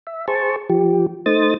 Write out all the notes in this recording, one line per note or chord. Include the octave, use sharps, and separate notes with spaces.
E5
G#4 C5 A5 C#6
F3 G4
A3 D#4 C5 D#6 A6